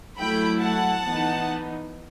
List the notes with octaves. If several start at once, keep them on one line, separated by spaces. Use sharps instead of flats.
F#3 A3 E4 G5 B5
F#5 A5
E3 B3 D#4